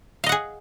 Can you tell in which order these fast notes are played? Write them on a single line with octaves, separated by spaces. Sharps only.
F5 D#5 F#5 G#4